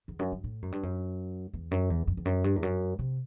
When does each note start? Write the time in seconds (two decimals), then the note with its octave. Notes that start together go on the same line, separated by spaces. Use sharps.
0.08 E2
0.19 F#2
0.32 G2
0.44 A2
0.62 F#2
0.72 G2
0.83 F#2
1.53 E2
1.71 F#2
1.90 E2
2.07 F#2
2.17 E2
2.25 F#2
2.44 G2
2.56 E2
2.63 F#2
2.99 C3